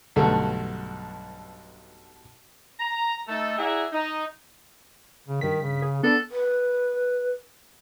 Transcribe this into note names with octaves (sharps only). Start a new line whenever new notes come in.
B1 G2 D3 A3
A#5
A3 D#4 A4
E4 G#4 D5 E5 F#5 A#5
D#4
C#3
G2 D#3 B6
C#3
G#4
B3 D4 A4
B4